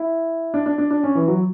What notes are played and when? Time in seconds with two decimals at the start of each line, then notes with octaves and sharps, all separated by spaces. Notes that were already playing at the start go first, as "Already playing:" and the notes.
Already playing: E4
0.54 D4
0.66 D4
0.78 D4
0.91 D4
1.04 C#4
1.15 E3
1.28 F#3